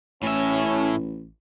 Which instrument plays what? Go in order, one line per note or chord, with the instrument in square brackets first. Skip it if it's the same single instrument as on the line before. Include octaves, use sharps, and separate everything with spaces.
[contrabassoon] A1 [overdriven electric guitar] A2 E5 [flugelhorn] C#4